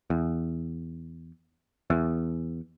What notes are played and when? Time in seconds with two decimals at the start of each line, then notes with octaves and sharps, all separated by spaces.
0.10 E2
1.90 E2